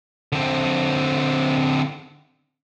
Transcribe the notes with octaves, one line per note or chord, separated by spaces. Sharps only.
D3 C4